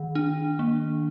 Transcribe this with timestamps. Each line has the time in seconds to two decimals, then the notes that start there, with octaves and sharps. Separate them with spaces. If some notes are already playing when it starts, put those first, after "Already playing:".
Already playing: D#3
0.15 D4
0.59 A#3